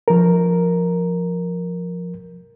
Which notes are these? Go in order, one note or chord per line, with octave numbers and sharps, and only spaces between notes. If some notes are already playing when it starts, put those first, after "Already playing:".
F3 A#4